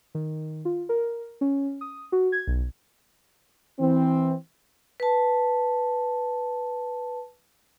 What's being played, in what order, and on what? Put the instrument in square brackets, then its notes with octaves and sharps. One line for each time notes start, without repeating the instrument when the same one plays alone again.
[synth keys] D#3
F4
A#4
C#4
D#6
F#4
G#6
B1
[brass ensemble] E3 C4
[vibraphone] B4 A5